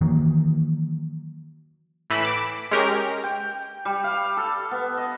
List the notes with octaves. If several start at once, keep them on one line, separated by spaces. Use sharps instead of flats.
D#3 E3 F#3 A#3
A2 E3 B5 E6
D6
G#3 C#4 G4 A#4
G5
G3
F5
A4
B3
D#5